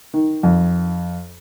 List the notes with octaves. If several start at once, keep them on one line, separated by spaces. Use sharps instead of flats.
D#3
F2